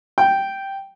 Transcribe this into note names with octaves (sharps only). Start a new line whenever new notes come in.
G5